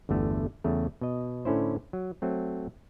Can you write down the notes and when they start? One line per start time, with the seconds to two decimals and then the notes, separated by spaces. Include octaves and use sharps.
0.09 G1 E2 D3 A3
0.64 E2 C#3 A3
1.01 B2 D#5
1.45 A2 D3 C#4 E4 C5
1.93 F#3
2.22 F#3 A3 C4